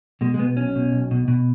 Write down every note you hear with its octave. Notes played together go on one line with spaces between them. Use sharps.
B2 G#3
G#3
B2 B3
B1 C#4
B2
B1
B2
B2